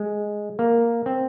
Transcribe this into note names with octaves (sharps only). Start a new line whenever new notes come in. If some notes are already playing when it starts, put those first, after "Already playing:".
Already playing: G#3
A#3
C4